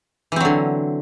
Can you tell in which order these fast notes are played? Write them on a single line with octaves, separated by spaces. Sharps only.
E3 C4 F#3 D3